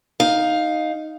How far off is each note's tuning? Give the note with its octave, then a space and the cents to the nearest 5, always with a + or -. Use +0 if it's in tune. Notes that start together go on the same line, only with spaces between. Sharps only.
D#4 +0 F5 +10